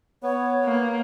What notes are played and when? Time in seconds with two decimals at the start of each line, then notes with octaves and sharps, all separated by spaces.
0.23 B3 C#5
0.65 A#3